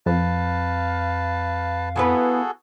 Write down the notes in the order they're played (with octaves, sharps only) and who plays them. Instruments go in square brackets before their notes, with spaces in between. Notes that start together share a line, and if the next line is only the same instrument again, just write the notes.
[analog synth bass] F2 [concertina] B4 A5 [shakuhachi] F5
[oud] E3 B3 B4 [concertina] F#4 G#4 A4